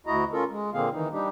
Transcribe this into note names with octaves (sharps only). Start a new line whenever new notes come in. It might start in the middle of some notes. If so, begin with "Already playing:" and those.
D2 E4 F#4 D#5 A#5
C#4 F4 A4 A#4
G#3
A#2 D3 A#3 C4 G#4 F5
D#3 E3 D#4
G3 D4 D#4 G4